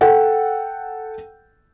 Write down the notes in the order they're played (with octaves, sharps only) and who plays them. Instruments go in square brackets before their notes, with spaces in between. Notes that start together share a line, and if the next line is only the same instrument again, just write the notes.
[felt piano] A4 F#5 G5